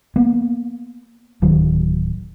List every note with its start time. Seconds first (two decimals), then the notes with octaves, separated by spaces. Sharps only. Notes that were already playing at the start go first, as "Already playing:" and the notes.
0.16 A#3 B3
1.42 D1 D#3 F#3